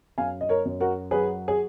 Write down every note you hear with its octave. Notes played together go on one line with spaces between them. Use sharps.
F#2 F5 G#5
D#5
A#4 C#5
F#2
F#4 A#4
F#3 G#4 B4
G#4